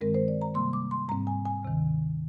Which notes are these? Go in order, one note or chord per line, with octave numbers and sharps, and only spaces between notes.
G2 D#3 G#3 C4 A#4
C5
D5
A#5
C3 G3 A#3 C6
D6
C6
G#2 G3 C4 A#5
G#5
G#5
D2 C3 D#3